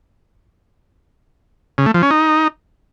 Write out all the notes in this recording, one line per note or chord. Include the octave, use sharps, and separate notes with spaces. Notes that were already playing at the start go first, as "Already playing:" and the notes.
C#3
A3
F3
C#4
D#4